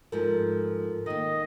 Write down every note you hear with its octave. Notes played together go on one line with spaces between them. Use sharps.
G#2 F3 A4 A#4
D#3 A#3 D#5